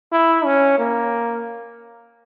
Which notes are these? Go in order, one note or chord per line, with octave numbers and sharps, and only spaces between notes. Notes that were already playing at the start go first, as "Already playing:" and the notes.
E4
C#4
A#3